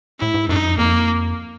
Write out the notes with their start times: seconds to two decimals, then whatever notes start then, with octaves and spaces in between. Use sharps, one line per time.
0.19 A2 E4
0.34 G#2
0.48 F#2 D#4
0.64 F2
0.78 F2 A#3